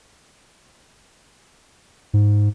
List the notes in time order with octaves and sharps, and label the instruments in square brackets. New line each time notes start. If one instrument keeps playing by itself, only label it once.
[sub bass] G#2